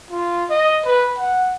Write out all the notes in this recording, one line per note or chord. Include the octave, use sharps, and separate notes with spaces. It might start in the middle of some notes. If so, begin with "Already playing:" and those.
F4
D#5
B4
F#5